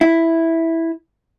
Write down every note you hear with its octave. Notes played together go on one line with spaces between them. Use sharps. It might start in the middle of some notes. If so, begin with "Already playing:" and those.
E4